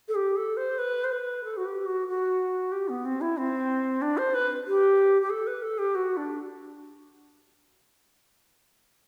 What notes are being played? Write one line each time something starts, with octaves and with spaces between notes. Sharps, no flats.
A4
G4
A4
C5
B4
C5
B4
A4
F#4
G4
F#4
F#4
G4
B3
C4
E4
C4
D4
C5
B4
G4
G4
A4
B4
A4
G4
F#4
D4